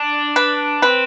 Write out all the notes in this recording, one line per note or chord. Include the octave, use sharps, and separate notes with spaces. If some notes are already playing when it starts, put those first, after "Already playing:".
Already playing: D4
B4
C4 B4